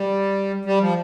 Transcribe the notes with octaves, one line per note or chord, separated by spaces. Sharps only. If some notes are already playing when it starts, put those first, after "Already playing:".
Already playing: G3
G3
F3